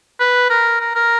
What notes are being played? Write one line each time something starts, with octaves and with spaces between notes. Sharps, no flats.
B4
A#4
A#4
A#4